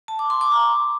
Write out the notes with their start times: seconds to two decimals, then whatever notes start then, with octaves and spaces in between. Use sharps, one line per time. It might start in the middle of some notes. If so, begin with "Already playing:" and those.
0.08 A5
0.19 D6
0.30 C6
0.41 D6
0.52 A#5